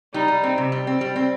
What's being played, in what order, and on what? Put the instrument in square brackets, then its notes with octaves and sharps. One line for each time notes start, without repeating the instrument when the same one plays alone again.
[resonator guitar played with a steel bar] G3 [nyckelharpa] D#4
[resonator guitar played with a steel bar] G3
C4
C3
G3
C4
G3
C4